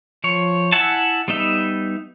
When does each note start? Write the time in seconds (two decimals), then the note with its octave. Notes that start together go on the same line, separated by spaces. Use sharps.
0.24 F3 C#5
0.72 E4 E5 F#5 G#5 A5
1.28 G3 B3 D#4 E5